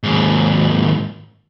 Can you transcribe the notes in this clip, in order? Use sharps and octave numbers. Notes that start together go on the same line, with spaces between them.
D#2 G#2